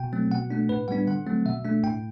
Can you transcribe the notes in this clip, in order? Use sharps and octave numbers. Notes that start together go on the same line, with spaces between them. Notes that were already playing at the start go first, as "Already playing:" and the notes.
Already playing: B2 G5
F#3 A3 C4
B2 F#5
A3 D4
A2 B4
G3 B3 D4 F#5
D3 F#5
F#3 A3 C4
B2 E5
A3 D4
A2 G5